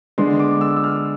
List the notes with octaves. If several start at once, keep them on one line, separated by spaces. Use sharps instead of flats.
D3 G#3 B3 D4 C6
D6
E6
E6
F6